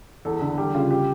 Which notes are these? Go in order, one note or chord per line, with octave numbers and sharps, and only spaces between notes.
E2 A4
D3
G3 G4
C#3 F4
G4